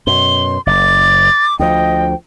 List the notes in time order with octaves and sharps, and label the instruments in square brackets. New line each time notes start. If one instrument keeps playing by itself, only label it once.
[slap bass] F#2 B2 [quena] C6 [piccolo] G7
[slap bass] F#1 [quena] D6 [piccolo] A6
[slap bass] D2 F3 [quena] D#5 [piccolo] G5